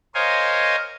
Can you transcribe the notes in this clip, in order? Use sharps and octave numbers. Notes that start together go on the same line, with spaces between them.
A#4 C5 C#5 D#5 F5 G#5